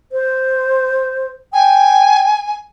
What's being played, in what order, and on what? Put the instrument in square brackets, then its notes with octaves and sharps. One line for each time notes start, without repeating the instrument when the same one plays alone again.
[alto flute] C5
[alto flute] G5 [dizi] G#5